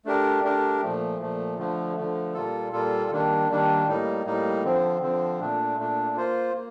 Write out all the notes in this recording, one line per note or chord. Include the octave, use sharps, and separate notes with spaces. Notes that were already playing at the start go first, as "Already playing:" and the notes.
A3 D4 G4 A#4
A3 D4 G4 A#4
A#2 F3 A3
A#2 F3 A3
D3 F3 A3
D3 F3 A3
A#2 G3 A#3 F4 A4
A#2 G3 A#3 F4 A4
D#3 G3 A#3 D4
D#3 G3 A#3 D4
A2 G3 A#3 D#4
A2 G3 A#3 D#4
D3 F3 C4
D3 F3 C4
A#2 A3 D4
A#2 A3 D4
A#3 F4 C5
A#3